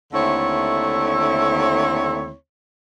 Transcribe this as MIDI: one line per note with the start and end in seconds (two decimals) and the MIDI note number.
0.13 2.33 39
0.13 2.33 50
0.13 2.33 57
0.13 2.33 60
0.13 2.33 64
0.13 2.33 73